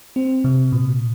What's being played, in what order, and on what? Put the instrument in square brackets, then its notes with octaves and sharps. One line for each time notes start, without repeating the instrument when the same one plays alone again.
[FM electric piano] C4
C3
A#2